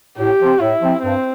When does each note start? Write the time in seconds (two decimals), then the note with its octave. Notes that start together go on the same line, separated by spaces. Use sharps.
0.18 A2 G4
0.39 F3 C4
0.60 A2 E4
0.80 F3 C4
1.02 G2 C4